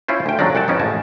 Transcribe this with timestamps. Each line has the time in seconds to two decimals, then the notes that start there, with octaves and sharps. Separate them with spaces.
0.08 C#4 E4 F4 C5
0.26 D2 G5
0.39 F2 F#3 G#3 C#4 D4 D5
0.55 C2 F#5 G5 A5
0.68 F2 B3 C#4 D#4
0.80 A1 G#3 A5